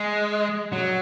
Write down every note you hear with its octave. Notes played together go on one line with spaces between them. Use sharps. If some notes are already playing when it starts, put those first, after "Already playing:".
Already playing: G#3
F#3